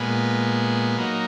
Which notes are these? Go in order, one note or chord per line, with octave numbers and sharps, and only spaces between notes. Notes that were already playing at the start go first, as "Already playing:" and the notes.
Already playing: A#2 G#3 B3
F#3 A#3 D#4